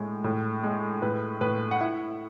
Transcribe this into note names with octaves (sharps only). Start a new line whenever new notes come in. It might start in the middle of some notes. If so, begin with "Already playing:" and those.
Already playing: A2 G#3
A2
G#3
A2 B4
A2 B4
F#5
E4 E5